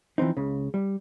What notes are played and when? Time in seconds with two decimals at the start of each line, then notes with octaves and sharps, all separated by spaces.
0.18 E3 F3 C4 D#4
0.37 C#2 C#3
0.74 G3